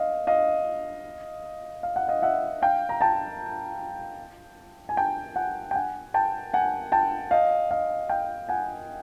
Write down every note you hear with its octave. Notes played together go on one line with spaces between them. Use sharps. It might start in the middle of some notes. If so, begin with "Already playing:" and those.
Already playing: D#5 F5
D#5 F5
F5
F#5
D#5 F5
E5 F#5
F5 G5
A#5
G5 A5
G#5
G5 A5
F#5 G#5
G5
F#5 G#5
G5 A5
F#5 G#5
G5 A5
D#5 F5
D#5 F5
F5 G5
F#5 G#5